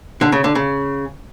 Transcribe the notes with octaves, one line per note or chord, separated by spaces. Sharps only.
D3
C#3
D3
C#3